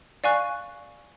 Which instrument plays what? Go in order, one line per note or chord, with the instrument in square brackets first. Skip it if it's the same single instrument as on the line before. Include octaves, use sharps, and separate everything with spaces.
[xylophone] D5 F5 G#5 C#6 F#6